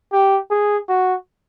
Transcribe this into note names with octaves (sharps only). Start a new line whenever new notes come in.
G4
G#4
F#4